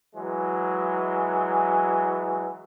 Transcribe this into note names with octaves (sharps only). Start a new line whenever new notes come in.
E3 F#3 G#3